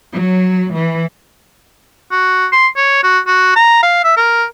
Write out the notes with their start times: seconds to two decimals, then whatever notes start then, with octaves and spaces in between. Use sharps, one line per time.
0.12 F#3
0.72 E3
2.11 F#4
2.52 C6
2.77 C#5
3.03 F#4
3.27 F#4
3.56 A#5
3.83 F5
4.04 E5
4.17 A#4